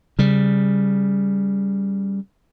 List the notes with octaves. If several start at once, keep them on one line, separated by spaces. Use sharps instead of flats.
C#3 G3